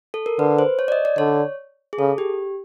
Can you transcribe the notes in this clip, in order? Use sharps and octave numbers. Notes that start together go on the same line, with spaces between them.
A4
A#4
D3 B4
C5
C#5
D5
D#5
D5
D3 C#5
G#4
C#3 A4
G4